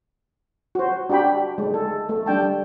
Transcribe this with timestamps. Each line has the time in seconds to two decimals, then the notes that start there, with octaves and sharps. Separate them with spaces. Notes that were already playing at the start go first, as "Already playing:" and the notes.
0.75 F#4 C5
1.10 D4 F#4 G4 G5 B5
1.58 G#3 A3
1.74 A4
2.09 A3 A4
2.26 G3 D4 G5 A5